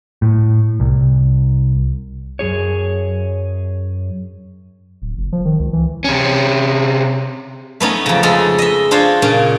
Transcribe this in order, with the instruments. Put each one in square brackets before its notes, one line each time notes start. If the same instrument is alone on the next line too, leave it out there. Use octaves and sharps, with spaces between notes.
[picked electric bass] A2
C2
[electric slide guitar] F#2 G#4 C#5
[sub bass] D1
F#1
F3
D#3
C#2
E3
[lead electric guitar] C3 C#4
[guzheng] A3 B3 C#4 D#4
F2 C#3
C#3 G#3 C#4 A4
D#5 E5
D4 F4 C5 C#5
A#2 C#3 C#4